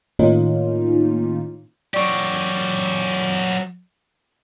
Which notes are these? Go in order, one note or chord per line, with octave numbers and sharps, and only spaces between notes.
A2 D#3 A#3 C#4 D#4 F4
F#3 G4 D5 C#6 D7